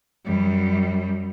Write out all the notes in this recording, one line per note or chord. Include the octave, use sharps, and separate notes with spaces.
F#2 G3